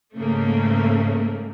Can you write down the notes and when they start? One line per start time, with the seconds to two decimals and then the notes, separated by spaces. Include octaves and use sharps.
0.15 G#2 C#3 A3 A#3